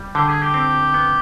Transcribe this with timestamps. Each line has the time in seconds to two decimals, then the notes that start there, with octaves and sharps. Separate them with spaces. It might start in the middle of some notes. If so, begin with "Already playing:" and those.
Already playing: G3
0.15 D3 G4
0.29 G#4
0.42 G4
0.54 C4
0.94 B3